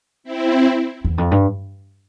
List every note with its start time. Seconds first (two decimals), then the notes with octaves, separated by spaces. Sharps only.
0.24 C4 E4
1.05 E2
1.18 F2
1.31 G2